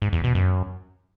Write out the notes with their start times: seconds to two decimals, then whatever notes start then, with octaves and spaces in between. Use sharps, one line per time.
0.02 G#2
0.13 E2
0.24 B2
0.35 F#2